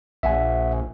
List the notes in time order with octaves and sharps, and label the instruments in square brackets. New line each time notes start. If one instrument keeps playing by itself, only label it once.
[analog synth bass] A#1 [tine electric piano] E5 F#5 G#5